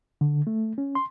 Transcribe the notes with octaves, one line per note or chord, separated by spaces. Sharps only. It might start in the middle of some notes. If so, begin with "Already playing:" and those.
D3
A3
C#4
C6